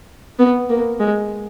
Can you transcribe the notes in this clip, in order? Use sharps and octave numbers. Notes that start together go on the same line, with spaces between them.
B3
A#3
G#3